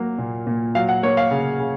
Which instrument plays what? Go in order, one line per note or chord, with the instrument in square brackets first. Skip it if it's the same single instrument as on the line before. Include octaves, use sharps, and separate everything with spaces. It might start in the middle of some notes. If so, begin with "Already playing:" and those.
Already playing: [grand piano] F#3 A#3
A#2
A#2
F#3 F5
F#5
A#3 C#5
F5
C#3
C#3